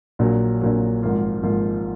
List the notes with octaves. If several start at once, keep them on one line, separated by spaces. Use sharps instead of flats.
A#1 A#2 F#3
A#1 A#2 F#3
G#1 G#2 F3 A#3 F4
G#1 G#2 F3 A#3 F4